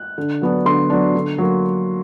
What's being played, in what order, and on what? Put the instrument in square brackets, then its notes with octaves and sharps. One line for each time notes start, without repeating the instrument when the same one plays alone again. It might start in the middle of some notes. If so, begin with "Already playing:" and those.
Already playing: [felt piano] F#6
D3
F#3 B3 D4
D3 C6
F#3 B3 D4
D3
F#3 A#3